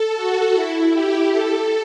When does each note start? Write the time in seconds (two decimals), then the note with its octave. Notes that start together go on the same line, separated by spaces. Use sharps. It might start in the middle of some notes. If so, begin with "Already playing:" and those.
Already playing: A4
0.16 F#4
0.54 E4
0.93 G4
1.32 A4